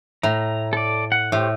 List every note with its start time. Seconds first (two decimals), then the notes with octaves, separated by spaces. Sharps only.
0.23 A2 A#5
0.73 A4 D5
1.12 F#5
1.32 A2 G4 C5 C#5